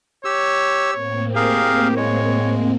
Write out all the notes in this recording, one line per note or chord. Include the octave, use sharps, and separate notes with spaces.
G4 C#5 E6
A2 A#3 C4 C#5
G4 G#4 A#4 F5
G#3 C#5